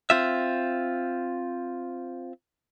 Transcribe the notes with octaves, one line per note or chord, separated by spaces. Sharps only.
C4 F4 E5